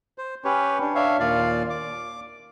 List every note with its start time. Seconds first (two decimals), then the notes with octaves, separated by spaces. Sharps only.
0.18 C5
0.45 C#4 G4 B4 C#5
0.81 D4
0.95 D4 C#5 E5 F5
1.20 D#2 A#2 F4 D5 F5
1.70 D6